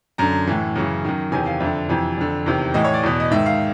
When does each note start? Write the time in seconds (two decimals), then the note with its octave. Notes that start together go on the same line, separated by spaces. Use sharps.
0.18 F#2 D3 A#5
0.47 A2 E3
0.76 F#2 C#3 E3
1.05 F#2 D#3
1.32 E2 C3 D#3 G#5
1.46 F5
1.60 F2 D3 E5
1.89 F2 C3 E3
2.18 F2 D3
2.46 E2 C3 D#3
2.74 A2 E3 D#5
2.84 C#5
2.94 D5
3.03 E2 B2
3.20 D#5
3.31 G#2 D#3 E5
3.46 F5